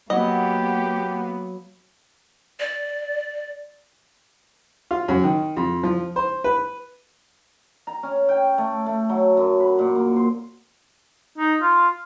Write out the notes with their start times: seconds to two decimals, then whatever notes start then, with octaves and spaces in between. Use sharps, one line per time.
0.10 F#3 A#3 B3 G4 D#5
2.60 D5
4.91 F4
5.08 F#2
5.24 D#3
5.57 F2
5.83 F3
6.16 C5
6.44 B4
7.87 A#5
8.03 C#4
8.29 G5
8.58 A3
8.86 A3
9.09 F#3
9.37 F#2
9.60 B4
9.79 A#2
9.95 A#3
10.16 C5
11.38 D#4
11.62 F4